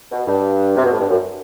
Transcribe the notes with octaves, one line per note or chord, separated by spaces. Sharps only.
B2
G2
C3
B2
A2
G2
F#2